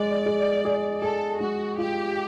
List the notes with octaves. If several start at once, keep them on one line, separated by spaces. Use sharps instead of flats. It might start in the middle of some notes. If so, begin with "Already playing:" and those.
Already playing: G#3 G#4 D5
G#4
G#4
G#4 A4
G#3 F#4
F4 G4